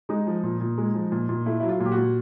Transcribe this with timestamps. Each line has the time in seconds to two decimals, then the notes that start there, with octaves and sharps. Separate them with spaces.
0.09 G#3 D#4
0.27 F3
0.43 A#2
0.60 A#2
0.78 G#3
0.94 F3
1.12 A#2
1.29 A#2
1.46 A3 E4
1.60 F#3 E4
1.69 F4
1.80 A#2
1.85 G4
1.92 F#4
1.98 A#2